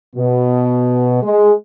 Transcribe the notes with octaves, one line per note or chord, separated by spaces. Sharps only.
B2
G#3